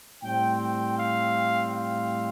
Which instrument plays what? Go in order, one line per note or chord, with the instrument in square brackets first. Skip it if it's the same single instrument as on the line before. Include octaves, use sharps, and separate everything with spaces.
[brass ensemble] A2 G3 C4 G5
G5
F5
F5